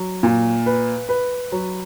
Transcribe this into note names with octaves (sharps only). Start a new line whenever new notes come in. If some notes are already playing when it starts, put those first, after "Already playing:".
Already playing: F#3
A#2
B4
B4
F#3